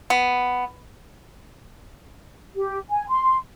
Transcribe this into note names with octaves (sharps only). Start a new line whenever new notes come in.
B3
G4
G#5
C6